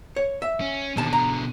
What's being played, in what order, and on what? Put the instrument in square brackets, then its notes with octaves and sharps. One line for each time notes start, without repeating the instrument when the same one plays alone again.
[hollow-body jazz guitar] C#5
E5
[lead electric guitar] C#4
[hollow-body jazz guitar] D#2 A5 [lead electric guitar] B2 D3
[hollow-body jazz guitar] A#5